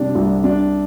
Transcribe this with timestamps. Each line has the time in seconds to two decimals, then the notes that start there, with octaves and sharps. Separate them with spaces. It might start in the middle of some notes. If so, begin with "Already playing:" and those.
Already playing: C3 G3 D4
0.15 C2
0.44 D4